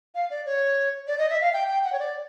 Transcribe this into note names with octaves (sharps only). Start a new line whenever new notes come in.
F5
D5
C#5
D5
D#5
E5
F5
G5
G5
F#5
C#5
D5